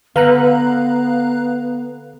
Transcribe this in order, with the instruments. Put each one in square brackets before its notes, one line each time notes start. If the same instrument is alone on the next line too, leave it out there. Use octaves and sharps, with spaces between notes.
[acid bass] D3 [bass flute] B3 [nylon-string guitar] B4 [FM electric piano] F5 A#5 F#6